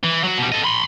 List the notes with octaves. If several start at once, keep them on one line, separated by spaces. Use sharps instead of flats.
E3
F#3 F#4
B2 G3
A4 D#5
B5 C6